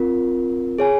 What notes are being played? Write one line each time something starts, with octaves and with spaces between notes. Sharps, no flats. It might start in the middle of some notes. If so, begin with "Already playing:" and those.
Already playing: C4 F4 A#4
G#4 C#5 G#5